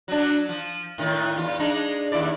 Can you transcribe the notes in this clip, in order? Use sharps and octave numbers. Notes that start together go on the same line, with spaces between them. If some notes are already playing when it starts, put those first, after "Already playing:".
F#3 D4
F3
A2 D#3
E2 F4
G#3 D4 D#4
D#2 E4 D5